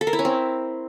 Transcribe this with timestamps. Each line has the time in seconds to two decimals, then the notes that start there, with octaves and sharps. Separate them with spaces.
0.01 A4
0.07 A#4
0.13 E4
0.19 C#4
0.25 C4